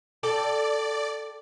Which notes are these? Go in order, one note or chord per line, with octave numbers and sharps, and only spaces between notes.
A4 D5 G5 A5